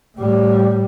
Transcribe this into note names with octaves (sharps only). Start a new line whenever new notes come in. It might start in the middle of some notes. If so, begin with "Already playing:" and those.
A2 G3